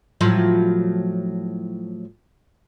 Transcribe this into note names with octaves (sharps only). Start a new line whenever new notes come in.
A2 F3 F#3